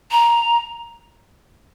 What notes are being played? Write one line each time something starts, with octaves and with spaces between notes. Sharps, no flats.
A#5